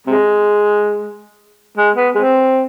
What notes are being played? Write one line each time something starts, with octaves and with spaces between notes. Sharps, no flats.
C3 G#3
G#3
B3
G#3 C4